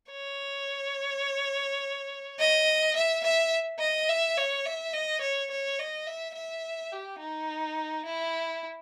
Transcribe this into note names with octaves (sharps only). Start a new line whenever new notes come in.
C#5
D#5
E5
E5
D#5
E5
C#5
E5
D#5
C#5
C#5
D#5
E5
E5
G4
D#4
E4